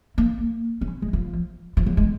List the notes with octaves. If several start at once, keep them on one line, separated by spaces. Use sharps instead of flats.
A#3
C#4
G#3
F3
F3
F#3
G#3